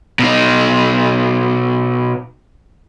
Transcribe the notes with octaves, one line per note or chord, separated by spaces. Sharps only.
B2 D#4